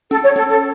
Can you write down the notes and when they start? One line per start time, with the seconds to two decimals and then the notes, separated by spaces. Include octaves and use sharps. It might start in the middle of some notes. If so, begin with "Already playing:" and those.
0.11 C#4 A4
0.23 C#5
0.36 C#4 A4
0.48 A4